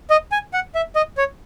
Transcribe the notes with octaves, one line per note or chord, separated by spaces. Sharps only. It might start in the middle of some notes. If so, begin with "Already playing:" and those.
D#5
G#5
F#5
E5
D#5
C#5